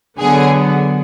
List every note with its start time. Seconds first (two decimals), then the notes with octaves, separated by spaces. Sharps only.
0.19 D3 F#3 B3 G#4